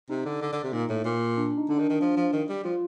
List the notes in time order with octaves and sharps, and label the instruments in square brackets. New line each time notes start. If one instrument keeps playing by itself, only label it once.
[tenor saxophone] C3 [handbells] D#4
[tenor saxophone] D3
D3
D3
C3
[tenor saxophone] A#2 [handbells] D#4
[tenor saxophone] A2
A#2
[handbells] D4
D#4
[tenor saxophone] D3 [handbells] D4
[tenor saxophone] D#3
D#3
[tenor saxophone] F3 [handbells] D4
[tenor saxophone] F3
D#3
G3
[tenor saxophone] F3 [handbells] F4